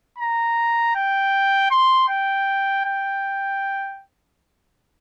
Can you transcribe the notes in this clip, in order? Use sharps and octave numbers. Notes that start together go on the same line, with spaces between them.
A#5
G5
C6
G5
G5